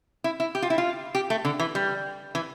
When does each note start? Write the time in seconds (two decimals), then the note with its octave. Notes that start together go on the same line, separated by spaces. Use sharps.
0.24 E4
0.40 E4
0.55 G4
0.62 F4
0.70 E4
0.78 F4
1.15 G4
1.30 A3
1.45 D3
1.59 E3
1.75 G3
2.35 E3